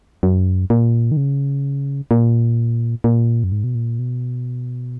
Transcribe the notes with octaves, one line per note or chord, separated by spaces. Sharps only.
F#2
A#2
D#3
C#3
A#2
A#2
F#2
G#2
B2
A#2
B2